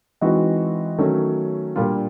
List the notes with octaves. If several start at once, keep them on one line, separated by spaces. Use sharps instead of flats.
E3 G#3 C4 D#4 F#4
D#3 F#3 A3 C#4
A#2 G3 A#3 D4 F4